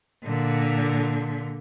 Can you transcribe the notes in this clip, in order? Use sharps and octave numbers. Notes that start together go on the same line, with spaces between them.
A#2 D3